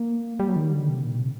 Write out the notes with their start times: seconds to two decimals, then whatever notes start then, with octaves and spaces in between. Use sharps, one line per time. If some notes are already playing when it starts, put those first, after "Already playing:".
Already playing: A#3
0.40 G3
0.49 F#3
0.56 D#3
0.72 D3
0.89 C3
1.05 A#2
1.19 C3